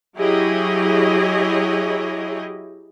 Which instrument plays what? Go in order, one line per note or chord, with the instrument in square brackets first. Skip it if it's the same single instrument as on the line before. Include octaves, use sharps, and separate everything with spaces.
[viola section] F#3 E4 G4 G#4 C#5 D#5